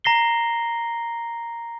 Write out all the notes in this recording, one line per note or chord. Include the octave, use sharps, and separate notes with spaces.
A#5 A#6 C7 G7